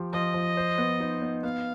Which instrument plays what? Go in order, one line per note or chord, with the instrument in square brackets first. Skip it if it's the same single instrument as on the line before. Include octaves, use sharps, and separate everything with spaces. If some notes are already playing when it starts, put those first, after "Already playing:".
Already playing: [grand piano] F3 G4
[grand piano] F3 [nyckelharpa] D#5
[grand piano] F3
C5
B3
D#4
B3
[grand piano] B3 [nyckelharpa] F5